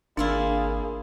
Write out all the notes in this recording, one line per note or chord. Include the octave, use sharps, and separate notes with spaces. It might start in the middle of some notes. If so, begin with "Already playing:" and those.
G#1 A#3 D4 E4 F4 G#4 D5